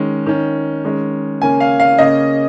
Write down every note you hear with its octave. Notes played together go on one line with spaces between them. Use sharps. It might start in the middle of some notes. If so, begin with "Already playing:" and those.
Already playing: D#3 G#3 C#4
D#3 C#4
D#3 G#3 C#4
C#3 A#3 C#4 G#5
F5
F5
C#3 A#3 C#4 D#5